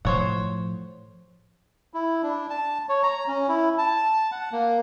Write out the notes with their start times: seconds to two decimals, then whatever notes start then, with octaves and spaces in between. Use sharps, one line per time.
0.05 A2 F3 C5 C#5 F#5
1.93 E4
2.23 D4
2.50 A5
2.89 C#5
3.03 A#5
3.28 C#4
3.48 E4
3.78 A5
4.32 F#5
4.52 A#3